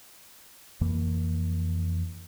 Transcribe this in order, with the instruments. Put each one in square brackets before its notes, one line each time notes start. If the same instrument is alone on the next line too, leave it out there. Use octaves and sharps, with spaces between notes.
[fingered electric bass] F2 E3 A#3